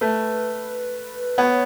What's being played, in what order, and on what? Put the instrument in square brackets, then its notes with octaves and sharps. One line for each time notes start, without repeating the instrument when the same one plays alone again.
[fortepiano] A3 [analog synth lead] B4
[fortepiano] B3 [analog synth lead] C#5